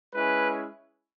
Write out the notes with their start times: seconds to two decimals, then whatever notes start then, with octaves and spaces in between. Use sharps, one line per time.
0.13 G#3 C#4 E4 B4